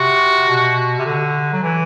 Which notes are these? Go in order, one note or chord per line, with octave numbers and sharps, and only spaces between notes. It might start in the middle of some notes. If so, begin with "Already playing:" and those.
Already playing: C3 F#4
B2
C3
D3
F#3
E3